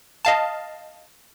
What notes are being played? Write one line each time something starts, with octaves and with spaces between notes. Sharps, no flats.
D#5 F5 A5